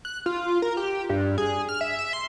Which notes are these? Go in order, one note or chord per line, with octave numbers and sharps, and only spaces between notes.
F#6
F4
A#4
G4
G2
G#4
F6
E5
E5
C6